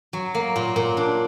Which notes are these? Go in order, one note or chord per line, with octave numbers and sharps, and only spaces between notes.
F#3
A#3
A#2
A#2
D4